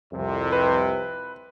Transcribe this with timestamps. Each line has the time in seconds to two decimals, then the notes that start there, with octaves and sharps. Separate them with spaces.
0.12 C2 F2 C3
0.52 B4